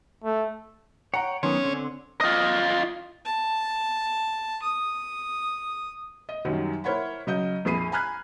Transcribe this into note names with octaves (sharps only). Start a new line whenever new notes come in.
A3
C#5 F#5 G5 A#5
D#3 F#3 B3 C#4 C6
D3 C4
F4 D#5
A5
D#6
D#5
F#2 D#3 F#3 G3
E4 A#4 C5 C#5 F#5 B5
C#3 F#3 D#5 G6
A#1 F2 G#4 B5 C7 D#7
G#5 A#5 B5 F6 F#6 G#6